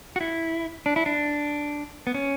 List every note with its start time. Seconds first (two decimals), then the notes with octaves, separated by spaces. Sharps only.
0.16 F#4
0.21 E4
0.86 D4
0.96 E4
1.06 D4
2.07 B3
2.14 C#4